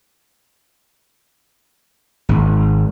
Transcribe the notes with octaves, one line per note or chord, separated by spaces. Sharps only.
G#1